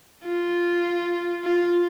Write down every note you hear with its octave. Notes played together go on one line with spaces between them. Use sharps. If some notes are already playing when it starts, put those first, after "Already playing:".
F4
F4